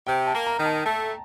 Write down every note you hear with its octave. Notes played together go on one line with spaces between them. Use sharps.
C3 G5
A5
A#3
A#5
D#3
A5
A3 A5